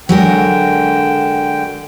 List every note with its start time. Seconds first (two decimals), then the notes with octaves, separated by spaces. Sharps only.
0.09 D3 F#3 G#3 A#4 G5